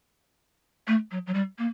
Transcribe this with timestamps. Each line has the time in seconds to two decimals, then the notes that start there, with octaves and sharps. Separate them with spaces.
0.87 A3
1.11 F#3
1.27 F#3
1.34 G3
1.58 A#3